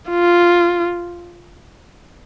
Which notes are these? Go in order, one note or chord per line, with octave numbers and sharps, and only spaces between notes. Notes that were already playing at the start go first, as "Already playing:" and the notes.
F4